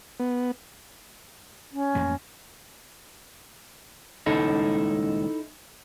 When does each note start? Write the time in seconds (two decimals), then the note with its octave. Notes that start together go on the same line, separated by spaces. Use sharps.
0.19 B3
1.72 C#4
1.95 A1 F2 A#3
4.26 D#1 C#2 G#3 D#4 E4 A4